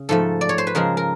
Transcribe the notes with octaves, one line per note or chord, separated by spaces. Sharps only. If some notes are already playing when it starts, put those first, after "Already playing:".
Already playing: C#3
G#2 F3 A3 A4
D5
C#5
C5
B4
C#3 F3 G#3 A#4
A#4